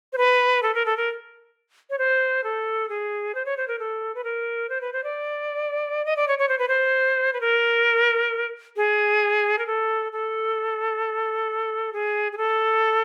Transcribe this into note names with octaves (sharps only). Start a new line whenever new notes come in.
C5
B4
A4
A#4
A4
A#4
C#5
C5
A4
G#4
C5
C#5
C5
A#4
A4
B4
A#4
C5
B4
C5
D5
D#5
D5
C#5
C#5
C5
B4
C5
B4
A#4
G#4
A#4
A4
A4
G#4
G#4
A4